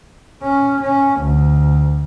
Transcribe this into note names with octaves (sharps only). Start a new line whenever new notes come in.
C#4
C#4
D2